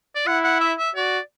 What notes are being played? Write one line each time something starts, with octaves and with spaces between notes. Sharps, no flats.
D5
E4 F#5
F#5
E5
E5
F#4 D5